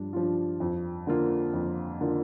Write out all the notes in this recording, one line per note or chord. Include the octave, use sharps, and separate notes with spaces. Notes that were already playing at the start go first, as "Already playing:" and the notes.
Already playing: G2 F3 D4
F3 D4 F4
F2
D3 A#3 F4
F2
D3 A#3 F4